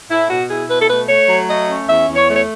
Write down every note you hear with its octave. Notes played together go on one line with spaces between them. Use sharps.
A2 E4
B2 F#4
E4 G#4
B2 B4
A4
A3 B4
A3 C#5
F#3
A3 D#5
C#4
E2 E5
E2
C#5
A3
C#5